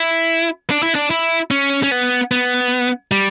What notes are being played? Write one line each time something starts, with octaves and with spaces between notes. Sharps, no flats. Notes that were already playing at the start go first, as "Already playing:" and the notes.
Already playing: E4
D4
E4
D4
E4
C#4
C#4
B3
B3
G3